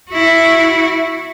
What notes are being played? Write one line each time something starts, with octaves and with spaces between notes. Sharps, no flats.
E4 F#4